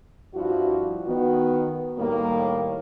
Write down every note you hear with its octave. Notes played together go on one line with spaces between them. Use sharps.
G2 F3 E4 F#4
D#3 B3 F#4
A2 D#3 G3 A#3